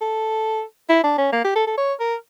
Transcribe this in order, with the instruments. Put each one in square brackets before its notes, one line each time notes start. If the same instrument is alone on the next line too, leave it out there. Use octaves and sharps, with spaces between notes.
[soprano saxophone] A4
E4
D4
C#4
A#3
G4
A4
A4
C#5
A#4